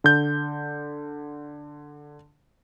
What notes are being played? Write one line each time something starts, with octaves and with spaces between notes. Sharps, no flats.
D3 G6